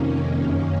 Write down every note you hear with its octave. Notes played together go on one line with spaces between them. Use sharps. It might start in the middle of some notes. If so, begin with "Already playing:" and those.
Already playing: F2 C3 D#3 A#3 C#4
F#2 D#3